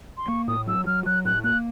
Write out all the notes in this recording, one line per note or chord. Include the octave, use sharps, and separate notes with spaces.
C6
A#3 C#6
A2 D#6
F#3 E6
F#3 F6
F#3 F#6
A2 F#6
A#3 F#6